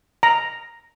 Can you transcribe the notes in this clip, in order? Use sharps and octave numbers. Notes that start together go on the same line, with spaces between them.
A#5